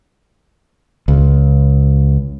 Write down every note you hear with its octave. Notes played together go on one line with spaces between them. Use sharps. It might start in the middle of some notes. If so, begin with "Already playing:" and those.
C#2